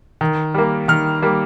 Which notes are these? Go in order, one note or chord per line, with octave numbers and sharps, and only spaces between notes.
D#3
G3 A#3
D#3 F6
G3 A#3